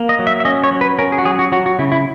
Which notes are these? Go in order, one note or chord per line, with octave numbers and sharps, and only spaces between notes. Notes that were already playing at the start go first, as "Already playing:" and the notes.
Already playing: A#3
D#5
F#3
E5
E5
C#4 D#5
C#5
F#3
B4
C#4 A#4
G#4
F#4
F#3 G#4
F#4
F#3 F#4
F#4
C#3 E4
E4